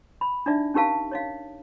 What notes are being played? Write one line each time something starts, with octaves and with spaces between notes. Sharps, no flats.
B5
D4 D#4 D5 E5
C#4 D#4 G4 A#4 F5 A5
C#5 D#5 F5